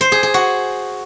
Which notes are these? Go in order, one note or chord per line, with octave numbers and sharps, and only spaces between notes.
C5
G#4
G#4
F#4